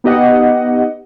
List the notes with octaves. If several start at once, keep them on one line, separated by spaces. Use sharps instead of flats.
B3 D#4 G4 D#5 F#5